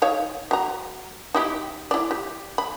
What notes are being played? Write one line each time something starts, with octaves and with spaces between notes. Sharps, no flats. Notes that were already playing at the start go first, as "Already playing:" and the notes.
D#4 C#5 F5
F#3 A#5
D#4 E4 G4
E4 D5
G4
B5